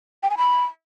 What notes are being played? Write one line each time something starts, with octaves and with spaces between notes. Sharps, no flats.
G5
G#5
B5